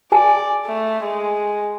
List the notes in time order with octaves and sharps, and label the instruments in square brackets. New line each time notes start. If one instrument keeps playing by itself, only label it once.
[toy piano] G#4 G#5 A5 [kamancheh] D5
[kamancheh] A3
G#3